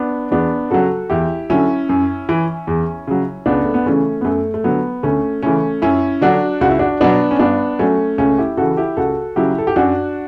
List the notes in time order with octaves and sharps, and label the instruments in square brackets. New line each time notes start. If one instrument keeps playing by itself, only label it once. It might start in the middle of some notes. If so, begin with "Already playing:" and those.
Already playing: [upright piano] B3 D4
E2 B3 D4
C#3 F#3 F#4 A4
E2 E4 G4
D3 F#3 C#4 E4
F#2
E3
E2
C#3 F#3
C#2 B3 D4
A3
B3
C#3 E3 A3 C#4
B3
F#2 A3
A3
D3 F#3 B3
D2 A3 C#4
C#3 E3 A3 C#4
F#2 C#4 E4
D3 F#3 D4 F#4
C#2 F#4
E4
D4 F#4
B2 F#3 B3 D4
C#4
G2 B3 D4
F#3 A3 C#4
C#2 A3 C#4
E4 G4
C#3 E3 F#4 A4
E4 G4
C#2 F#4 A4
C#3 F#3 E4 G4
A4
G4
F#2 D4 F#4